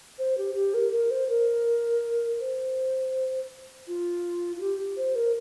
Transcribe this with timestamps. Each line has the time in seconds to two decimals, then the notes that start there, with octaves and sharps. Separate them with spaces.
0.19 C5
0.38 G4
0.55 G4
0.74 A#4
0.92 A#4
1.11 C5
1.29 A#4
2.40 C5
3.87 F4
4.56 F4
4.61 G4
4.97 C5
5.15 A#4